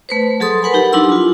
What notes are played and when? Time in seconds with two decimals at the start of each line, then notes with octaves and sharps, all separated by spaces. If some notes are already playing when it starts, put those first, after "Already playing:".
0.09 A3 B4 C5
0.40 F#3 G#4 A4 C6 D#6
0.62 A#4 B4 F#5 G#5 B5
0.74 D#4 G4 F#5
0.92 F#3 D4 E4 C6 E6
1.12 F4